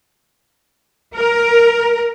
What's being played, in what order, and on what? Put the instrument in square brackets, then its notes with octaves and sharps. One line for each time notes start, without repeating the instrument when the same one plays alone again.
[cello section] A#4